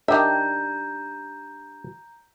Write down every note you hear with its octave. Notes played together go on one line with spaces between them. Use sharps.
D#3 D4 G4 E5 A#5 G6